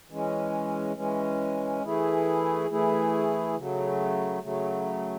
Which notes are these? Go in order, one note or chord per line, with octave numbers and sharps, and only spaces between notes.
E3 G#3 C#4
E3 G#3 C#4
E3 A3 E4 G#4
E3 A3 E4 G#4
C#3 F#3 A3
C#3 F#3 A3